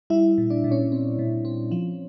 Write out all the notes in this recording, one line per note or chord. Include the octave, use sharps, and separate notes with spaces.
G3 E4 E5
A#2
D4 D5
A#2
C#4 C#5
C4
A#2
C4
F3